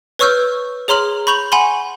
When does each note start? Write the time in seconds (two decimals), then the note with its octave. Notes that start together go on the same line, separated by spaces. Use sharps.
0.19 B4 C#5 C#6 E6 F6 G6
0.88 G#4 C#5 A#5 C6 F6 F#7
1.27 B5 C#6 G6 F7 F#7
1.52 F#5 G#5 B5 C6